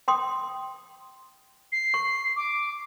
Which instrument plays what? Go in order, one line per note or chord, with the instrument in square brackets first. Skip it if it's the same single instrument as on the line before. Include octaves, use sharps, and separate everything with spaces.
[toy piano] G5 C6 D#6
[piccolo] C7
[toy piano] C#6
[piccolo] D6